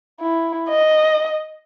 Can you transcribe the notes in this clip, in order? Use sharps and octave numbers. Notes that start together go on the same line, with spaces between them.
E4
D#5